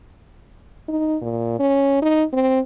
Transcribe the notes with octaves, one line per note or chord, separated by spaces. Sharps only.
D#4
A#2
C#4
D#4
C4